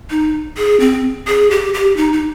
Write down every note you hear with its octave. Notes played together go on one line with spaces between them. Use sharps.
D#4
G#4
C4
G#4
G4
G4
D#4
D#4